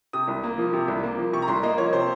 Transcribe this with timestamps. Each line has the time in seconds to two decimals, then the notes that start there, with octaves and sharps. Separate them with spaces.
0.13 C3 D#6
0.28 C2
0.43 A#3
0.58 F3
0.73 C3
0.88 C2
1.03 A#3
1.18 F3
1.33 C3 C#6
1.42 A#5
1.48 C2 C6
1.63 A#3 D#5
1.78 F3 C#5
1.93 C3 C5